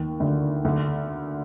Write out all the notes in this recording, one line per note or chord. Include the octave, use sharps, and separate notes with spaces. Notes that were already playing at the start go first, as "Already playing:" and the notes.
Already playing: D#2 D#3
D2 D3
D2 D3